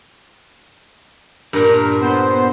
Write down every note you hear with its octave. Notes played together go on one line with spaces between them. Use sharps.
G2 A#2 A#4
B3 C5